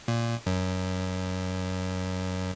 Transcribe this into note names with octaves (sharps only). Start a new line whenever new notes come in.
A#2
F#2